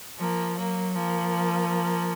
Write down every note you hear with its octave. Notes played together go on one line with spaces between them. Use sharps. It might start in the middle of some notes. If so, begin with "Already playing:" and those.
F3 A#3
F#3 A#3
F3 A#3